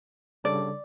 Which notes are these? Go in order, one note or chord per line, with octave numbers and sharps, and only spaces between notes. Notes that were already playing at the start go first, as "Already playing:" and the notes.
C#3 G3 D4 A4 C#5 D5